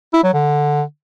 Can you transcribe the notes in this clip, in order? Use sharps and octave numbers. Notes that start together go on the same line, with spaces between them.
E4
F#3
D3